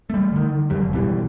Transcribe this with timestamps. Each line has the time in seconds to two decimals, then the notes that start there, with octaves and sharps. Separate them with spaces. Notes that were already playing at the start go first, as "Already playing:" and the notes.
0.10 G3 A3
0.32 D3 D#3
0.70 E2 F#3 G3
0.81 F1
0.93 B1 B2 E3 G3